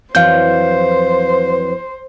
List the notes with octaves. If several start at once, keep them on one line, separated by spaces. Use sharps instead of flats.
F2 E3 F#3 B4 C5 F5 G6